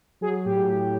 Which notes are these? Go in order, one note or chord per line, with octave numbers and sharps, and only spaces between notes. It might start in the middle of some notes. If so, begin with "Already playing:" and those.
F#3 G#4
A2 G4
A2